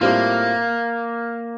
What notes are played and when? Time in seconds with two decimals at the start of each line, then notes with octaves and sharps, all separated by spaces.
0.01 A2 G3 A#3 C4 F4